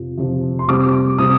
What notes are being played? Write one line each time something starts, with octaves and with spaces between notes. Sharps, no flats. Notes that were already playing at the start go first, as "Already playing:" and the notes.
Already playing: F2 C3 F3
F2 C3 F3
C6
C3 G3 C4 D6
C3 G3 C4 D#6